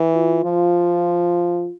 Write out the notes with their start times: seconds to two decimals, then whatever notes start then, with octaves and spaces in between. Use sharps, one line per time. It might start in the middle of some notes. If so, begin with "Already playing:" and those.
Already playing: E3
0.15 F4
0.44 F3